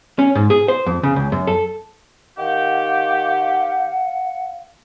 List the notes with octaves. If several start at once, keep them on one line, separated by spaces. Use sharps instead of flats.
C#4
G#2
G#4
C5
F2
C#3
C#2
F#2
A4
D#3 G4 F5 F#5